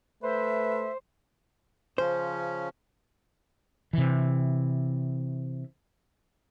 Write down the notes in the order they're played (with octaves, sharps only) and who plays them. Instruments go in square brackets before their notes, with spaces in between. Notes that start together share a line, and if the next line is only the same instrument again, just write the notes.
[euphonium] A3 [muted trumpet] B4 [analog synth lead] C5 [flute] E5
[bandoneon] C#3 F3 C#4 [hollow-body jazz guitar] C5
[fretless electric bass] C3 E3